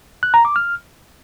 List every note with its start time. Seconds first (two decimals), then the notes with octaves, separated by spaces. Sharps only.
0.23 F#6
0.34 A#5
0.45 D6
0.56 F6